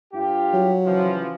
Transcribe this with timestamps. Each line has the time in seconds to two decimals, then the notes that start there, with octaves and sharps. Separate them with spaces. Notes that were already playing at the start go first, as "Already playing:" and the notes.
0.14 G2 F4 G4
0.53 F#3
0.86 C#3 E3 F3